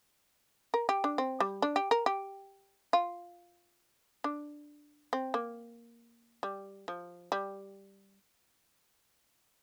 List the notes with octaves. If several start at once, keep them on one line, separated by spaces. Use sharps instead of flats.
A#4
G4
D4
C4
G3
D4
G4
A#4
G4
F4
D4
C4
A#3
G3
F3
G3